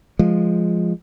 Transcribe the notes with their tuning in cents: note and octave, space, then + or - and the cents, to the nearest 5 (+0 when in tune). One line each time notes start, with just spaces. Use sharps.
F3 +0 G#3 +0